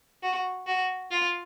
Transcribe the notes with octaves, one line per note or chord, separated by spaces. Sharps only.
F#4
F#4
F4